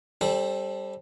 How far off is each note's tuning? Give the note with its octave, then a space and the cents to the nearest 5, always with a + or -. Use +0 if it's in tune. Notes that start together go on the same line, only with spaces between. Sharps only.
G3 +0 C4 +30 A4 +0